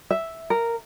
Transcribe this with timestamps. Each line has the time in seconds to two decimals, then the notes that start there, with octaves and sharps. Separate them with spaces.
0.10 E5
0.50 A#4